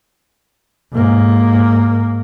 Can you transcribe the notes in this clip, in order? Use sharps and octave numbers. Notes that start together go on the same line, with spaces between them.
G#2 A#3